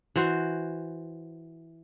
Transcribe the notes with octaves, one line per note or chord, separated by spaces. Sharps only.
E3 F#4 C5